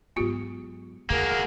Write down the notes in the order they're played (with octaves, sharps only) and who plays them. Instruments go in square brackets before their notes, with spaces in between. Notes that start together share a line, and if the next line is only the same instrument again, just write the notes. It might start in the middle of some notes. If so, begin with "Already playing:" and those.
[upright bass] G#2 F#3 [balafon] B3 F4 G4
[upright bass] E2 D3 [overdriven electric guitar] A#3 F#4 [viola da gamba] G#4 A#4